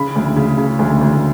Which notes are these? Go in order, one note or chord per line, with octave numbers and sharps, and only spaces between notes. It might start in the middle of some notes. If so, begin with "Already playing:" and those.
Already playing: C#3 B5
D2
C#3
C#3
D2
D2